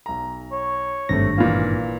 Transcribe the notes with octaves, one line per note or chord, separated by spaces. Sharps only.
B1 A#5
C#5
G#1 G2 C3 A3 A#6
A#2 E3 F5